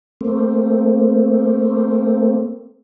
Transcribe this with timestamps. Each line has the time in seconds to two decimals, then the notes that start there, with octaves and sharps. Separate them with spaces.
0.21 A3 A#3 C4